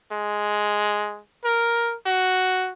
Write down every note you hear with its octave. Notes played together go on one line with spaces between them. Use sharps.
G#3
A#4
F#4